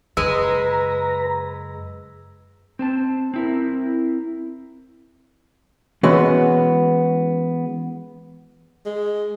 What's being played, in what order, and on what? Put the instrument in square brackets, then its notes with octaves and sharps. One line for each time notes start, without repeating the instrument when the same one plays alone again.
[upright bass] F#2 C#3 [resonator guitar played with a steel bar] G#3 [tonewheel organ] B4 A#5 [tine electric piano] E6
[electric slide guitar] C4 C5 A5
C4 E4 A#4
[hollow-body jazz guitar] E3 G#3 B3 C#4 F#4
[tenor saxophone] G#3